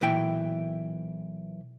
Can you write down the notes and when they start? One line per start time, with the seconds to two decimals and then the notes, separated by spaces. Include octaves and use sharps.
0.01 B1 A#2 E3 E4 E5 G5